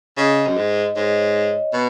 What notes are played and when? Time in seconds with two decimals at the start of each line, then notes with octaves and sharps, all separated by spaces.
0.18 C#3 D#5
0.47 F#2
0.57 G#2
0.95 G#2 C#5
1.07 D#5
1.20 C#5
1.73 B2 B4